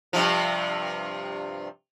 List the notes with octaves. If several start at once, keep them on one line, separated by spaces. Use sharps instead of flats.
G2 C3 F3